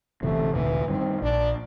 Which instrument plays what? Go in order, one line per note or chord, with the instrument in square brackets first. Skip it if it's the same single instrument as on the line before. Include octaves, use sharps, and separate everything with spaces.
[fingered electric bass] G1 C3 E3 [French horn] A3
[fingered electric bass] F1 D2 A#2 [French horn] E3
[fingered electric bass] G2 D#3 [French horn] C4
[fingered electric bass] A#1 [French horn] D4